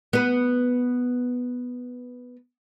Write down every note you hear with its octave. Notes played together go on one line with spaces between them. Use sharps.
B3 B4